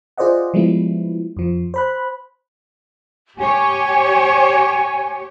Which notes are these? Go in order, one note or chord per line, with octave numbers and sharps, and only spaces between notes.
F4 G#4 C5 D5 D#5 F#5
F3 G3 G#3 B3 E4
F2 F3
C5 B5 F#6
G4 C#5 G#5